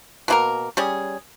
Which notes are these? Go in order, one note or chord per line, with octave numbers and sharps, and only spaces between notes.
B2 A#3 E4 A#4
G3 C#4 G#4